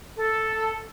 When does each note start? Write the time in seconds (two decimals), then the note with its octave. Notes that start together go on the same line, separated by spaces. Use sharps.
0.17 A4